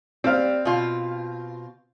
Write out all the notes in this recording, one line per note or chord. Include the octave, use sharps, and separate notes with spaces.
G3 C4 F5
B2 F4